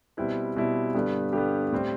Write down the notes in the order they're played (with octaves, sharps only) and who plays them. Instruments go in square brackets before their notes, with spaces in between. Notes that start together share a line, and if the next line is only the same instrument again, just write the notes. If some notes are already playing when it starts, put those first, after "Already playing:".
[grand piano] B2 G3 C4 E4 B4
B2 G3 C4 E4
G2 D3 G3 B3
G2 D3 G3 B3 G4
A2 G3 C4